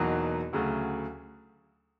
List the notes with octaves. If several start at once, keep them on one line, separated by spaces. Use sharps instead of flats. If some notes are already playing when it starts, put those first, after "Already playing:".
Already playing: E2 B2 F#3 A#3 D#4
D2 C#3 F#3 A3